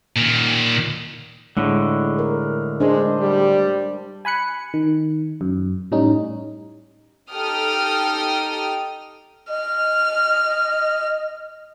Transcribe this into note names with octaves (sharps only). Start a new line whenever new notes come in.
A#2 D#3
A2 D3 G#3
A#4
G#3 D4 C5
G3
G#5 B5 F#6 C#7
D#3
F#2
A2 G3 C#4 D#4
D#4 G4 A4 G5 D#6 F6
D#5 F6